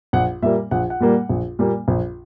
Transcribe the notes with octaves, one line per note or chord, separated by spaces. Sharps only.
A#1 F#5
A#2 G3 A#3 E5
A#1 F#5
F#5
A#2 G3 A#3
A#1
A#2 G3 A#3
A#1